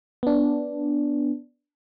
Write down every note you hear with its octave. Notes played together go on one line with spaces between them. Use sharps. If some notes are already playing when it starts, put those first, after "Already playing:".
B3 D4